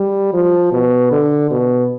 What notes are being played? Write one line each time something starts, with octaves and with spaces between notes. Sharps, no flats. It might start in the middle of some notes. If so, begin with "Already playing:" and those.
Already playing: G3
F3
B2
D3
B2